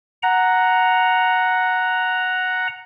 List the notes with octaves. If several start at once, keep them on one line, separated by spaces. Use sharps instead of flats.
F#5 A#5